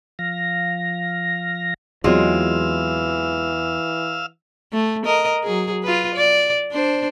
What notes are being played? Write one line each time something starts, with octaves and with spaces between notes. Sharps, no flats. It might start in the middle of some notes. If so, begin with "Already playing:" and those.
F3 F5 A#6
E2 E3 F#3 G#3 C4 F4 F5 E6
A3
A#4 D#5
F#3 G#4
F4 B4
D5
D4 C5